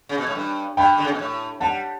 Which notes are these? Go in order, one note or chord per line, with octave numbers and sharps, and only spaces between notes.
C#3
B2
A2
G2
G2 G5 B5
D3
C#3
B2
A2
G3 F#5 A5